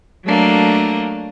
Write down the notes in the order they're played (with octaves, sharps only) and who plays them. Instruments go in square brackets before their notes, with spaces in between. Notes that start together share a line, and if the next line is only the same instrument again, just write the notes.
[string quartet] F#3 A3 A#3 D4